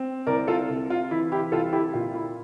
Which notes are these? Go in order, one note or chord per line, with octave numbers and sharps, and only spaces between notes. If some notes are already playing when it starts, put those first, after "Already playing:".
Already playing: C4
C2 A#4 D5
F4 A4
C3
F4
E3 E4
E4 G4
C2 F4 A4
E4 G4
A#2 F4
E4